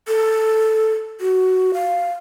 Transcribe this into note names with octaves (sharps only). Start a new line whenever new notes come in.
A4
F#4
F5